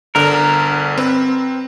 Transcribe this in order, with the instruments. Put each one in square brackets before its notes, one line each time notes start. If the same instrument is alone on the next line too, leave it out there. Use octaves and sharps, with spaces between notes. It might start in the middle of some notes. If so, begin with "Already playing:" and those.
[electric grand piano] G1 D3 F6 [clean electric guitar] A#4
[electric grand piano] C4 B4